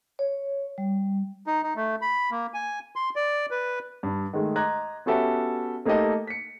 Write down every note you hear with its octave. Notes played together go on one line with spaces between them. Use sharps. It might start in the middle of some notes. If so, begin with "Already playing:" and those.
C#5
G3
D#4
D#4
A3
B5
A#3
G#5
C6
D5
B4
G2
D#3 G#3 A3
D#5 A#5 C6 D6 F#6 G#6
B3 C#4 F#4 G4 A4 E5
A3 A#3 D#4 G4 A4 D#5
B6 C#7